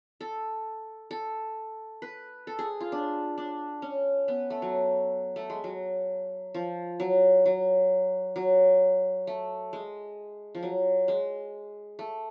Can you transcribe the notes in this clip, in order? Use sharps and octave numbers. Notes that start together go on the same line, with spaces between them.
A4
A4
B4
A4
G#4
F4
D4
D4
C#4
B3
A3
F#3
A3
G#3
F#3
F3
F#3
F#3
F#3
A3
G#3
F3
F#3
G#3
A3